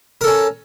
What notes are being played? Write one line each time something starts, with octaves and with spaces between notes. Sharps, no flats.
C#4 A4 A#4